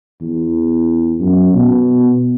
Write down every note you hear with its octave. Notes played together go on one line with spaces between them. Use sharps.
E2
F#2
B2